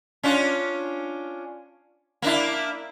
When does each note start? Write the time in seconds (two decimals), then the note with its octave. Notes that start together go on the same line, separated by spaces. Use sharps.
0.23 C#4 D4 F4
2.22 A#3 D4 E4